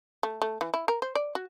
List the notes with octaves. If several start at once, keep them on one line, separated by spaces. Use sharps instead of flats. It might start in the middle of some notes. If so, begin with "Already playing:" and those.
A3
A3
E3
E4
A#4
C5
D5
F#4